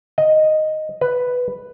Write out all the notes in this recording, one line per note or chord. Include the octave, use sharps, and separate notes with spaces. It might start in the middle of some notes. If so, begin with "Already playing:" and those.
D#5
B4